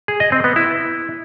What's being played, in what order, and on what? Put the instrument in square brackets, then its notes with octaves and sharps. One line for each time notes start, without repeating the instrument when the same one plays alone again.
[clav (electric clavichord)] G#4
D#5
C4
B3
E4